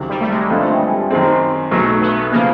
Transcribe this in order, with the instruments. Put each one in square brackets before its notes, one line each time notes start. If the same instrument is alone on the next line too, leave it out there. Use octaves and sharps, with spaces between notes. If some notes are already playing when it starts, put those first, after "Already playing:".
Already playing: [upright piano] C#2 C3 D#3 F#3
[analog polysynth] G3
A3
G#3
[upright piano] G2 D3 F3 A3 C4
F#2 D#3 G#3 C4
[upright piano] B1 B2 F#3 [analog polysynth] A3
[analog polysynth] B3
[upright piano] C#3 F3 [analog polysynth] A#3